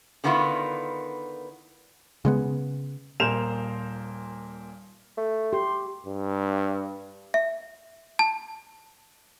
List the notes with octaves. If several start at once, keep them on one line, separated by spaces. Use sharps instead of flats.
D3 D#3 B3 E4 F4
C#3 G#3 B3
D#1 A#2 A#4 C5 E7 F7
A3
G4 C6
G2
E5
A5